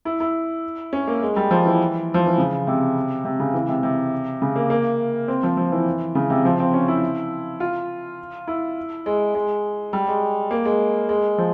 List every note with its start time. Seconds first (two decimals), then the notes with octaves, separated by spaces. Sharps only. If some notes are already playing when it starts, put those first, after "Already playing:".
0.05 E4
0.20 E4
0.93 C#4
1.07 A#3
1.22 G#3
1.36 G3
1.51 F3
1.66 E3
2.14 F3
2.26 E3
2.38 C#3
2.67 C3
3.25 C3
3.40 C#3
3.54 E3
3.68 C3
3.83 C3
4.42 C#3
4.56 A#3
4.70 A#3
5.28 C4
5.43 F3
5.57 F3
5.72 E3
6.15 C#3
6.30 C3
6.45 F3
6.60 C4
6.74 C#4
6.88 E4
7.60 F4
8.47 E4
9.06 G#3
9.35 G#3
9.93 G3
10.08 G#3
10.51 A#3
10.65 G#3
11.09 G#3
11.38 F3